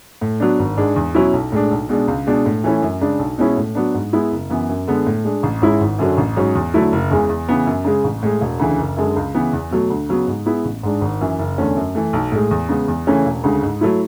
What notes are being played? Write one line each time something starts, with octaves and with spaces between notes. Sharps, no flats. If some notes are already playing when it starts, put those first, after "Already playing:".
A2
F#3 B3 D4
G#1
G#2 G#3 D4
E2
B2 F#3 C#4 E4
B1
A2 G#3 D4
B1
B2 G#3 D4
C#2
B2 G#3 D4
A2
E3 A3 C#4 E4
F#2
C#3 G#3 D4
B1
B2 G#3 C#4 E4
A2
F#3 B3 D4
G#2
G#3 B3 E4
F#1
F#2 E3 B3
F#2
D3 G#3 B3
A2
G#3 D4
A1
G#2 G#3 C#4 E4
G#1
F#2 D3 F#3 C#4
A1
G#2 F#3 C#4
E2
D3 F#3 A3 E4
F#1
E2 C#3 E3 G#3
E2
C#3 E3 B3
F#2
C#3 G#3
A1
A2 G#3
E1
D2 C#3 E3
F#1
F#2 D3 G#3
C#2
C#3 E3 B3
E2
B2 F#3 A3
D2
C#3 F#3 B3
G#2
G#3 B3 E4
A1
G#2 G#3 D4
G#1
F#2 E3
F#1
E2 D3 A3 C#4
F#2
E3 A3
B1
A2 G#3
E2
C#3 G#3 B3
E2
C#3 E3 A3 C#4
E1
D2 C#3 G#3
G#2
F#3 A3 E4